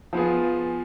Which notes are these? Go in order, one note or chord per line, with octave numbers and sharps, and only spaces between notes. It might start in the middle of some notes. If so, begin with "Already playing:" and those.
F3 B3 F4 G#4